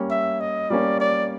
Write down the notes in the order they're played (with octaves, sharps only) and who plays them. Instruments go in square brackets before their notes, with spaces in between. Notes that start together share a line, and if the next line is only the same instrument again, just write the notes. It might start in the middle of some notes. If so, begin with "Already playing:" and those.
Already playing: [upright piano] G3 A#3 C#4
[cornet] E5
D#5
[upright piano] G3 A#3 C#4 [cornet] D5
[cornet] D5